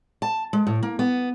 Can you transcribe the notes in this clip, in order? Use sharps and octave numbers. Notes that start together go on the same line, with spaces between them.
A5
G#3
A2
A#3
B3